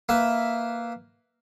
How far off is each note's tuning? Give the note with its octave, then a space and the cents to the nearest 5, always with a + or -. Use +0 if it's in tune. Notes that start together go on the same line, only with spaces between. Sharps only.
A#3 +0 B4 +0 E5 +0